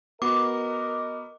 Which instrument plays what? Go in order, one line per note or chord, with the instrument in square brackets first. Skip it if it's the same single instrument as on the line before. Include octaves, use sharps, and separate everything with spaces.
[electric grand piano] B3 F#4 [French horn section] A#4 D#5 [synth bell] D6